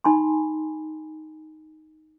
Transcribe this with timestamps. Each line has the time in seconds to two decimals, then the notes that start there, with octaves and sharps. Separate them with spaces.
0.04 D#4 G#5 A5 B5 C6